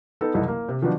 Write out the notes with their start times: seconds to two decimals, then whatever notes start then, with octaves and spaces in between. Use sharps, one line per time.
0.21 B3 D#4 A4
0.34 F#1 C2 E3 A4 D#5
0.48 A#3
0.68 C3
0.82 D#3 F3 F#3 B3 D4 D#4